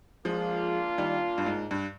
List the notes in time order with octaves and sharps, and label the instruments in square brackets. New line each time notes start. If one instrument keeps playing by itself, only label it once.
[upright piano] F3 G#3 [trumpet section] A#3 D4 F4
[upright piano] D#3 G3
G2
G#2
G2